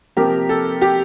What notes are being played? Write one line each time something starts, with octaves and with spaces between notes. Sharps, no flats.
C3 F3 A#3 G4 A#4
A4
G4